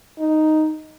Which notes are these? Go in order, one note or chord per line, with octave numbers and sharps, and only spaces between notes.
D#4